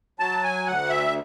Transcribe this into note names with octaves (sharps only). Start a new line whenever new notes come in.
F#3 A5
G#5
D2 F#5
E5